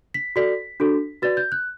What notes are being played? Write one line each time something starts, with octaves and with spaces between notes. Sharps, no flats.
B6
F#4 A4 D5 B6
D4 F#4 A4
F#4 B4 D5 A6
G6
F#6